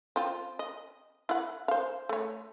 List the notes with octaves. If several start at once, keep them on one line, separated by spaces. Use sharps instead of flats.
C4 F4
D#5
E4 F#5
C5 F5
A3 C#5